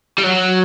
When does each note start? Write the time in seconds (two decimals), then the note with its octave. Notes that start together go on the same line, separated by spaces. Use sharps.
0.18 G3
0.23 F#3